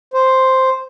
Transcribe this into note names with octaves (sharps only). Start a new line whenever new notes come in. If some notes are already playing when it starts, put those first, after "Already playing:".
C5